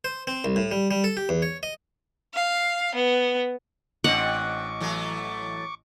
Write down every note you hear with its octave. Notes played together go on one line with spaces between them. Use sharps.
C5
C4
C2
A2
G3
G3
A4
G4
E2
C#5
D#5
F5
B3
A1 C4 D4 D#5 F#5 C#6 D6
E3 F#3 A3